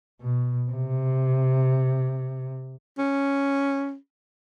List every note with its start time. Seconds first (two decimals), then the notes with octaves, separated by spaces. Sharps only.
0.21 B2
0.70 C3
2.98 C#4